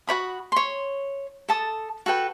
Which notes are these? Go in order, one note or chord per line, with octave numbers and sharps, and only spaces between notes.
F#4 C#5 B5 D#6
C#5 C6
A4 A5 D#6
F#4 A4 B4 G5